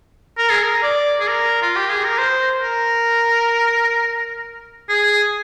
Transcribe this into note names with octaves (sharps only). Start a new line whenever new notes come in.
A#4
G#4
A#4
D5
G#4
A#4
F4
G4
G#4
A#4
C5
A#4
G#4